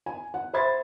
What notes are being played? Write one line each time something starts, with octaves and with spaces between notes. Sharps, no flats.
G#5
F#5
C5 E5 B5 C6 G#6 A6